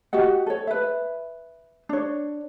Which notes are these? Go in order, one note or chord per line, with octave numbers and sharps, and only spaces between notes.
F#4 G4 D#5 F#5
A4 C#5
B4 E5
D4 C#5